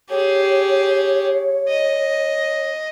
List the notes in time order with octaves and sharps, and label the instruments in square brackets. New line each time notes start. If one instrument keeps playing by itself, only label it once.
[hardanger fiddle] G4 G#4 [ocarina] C#5
[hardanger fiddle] D#5